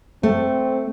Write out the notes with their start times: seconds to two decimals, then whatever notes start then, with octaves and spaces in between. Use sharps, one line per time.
0.23 A3 C4